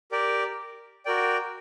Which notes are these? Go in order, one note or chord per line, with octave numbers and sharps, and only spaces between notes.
G4 A#4 D5 G5
F#4 A#4 D5 G5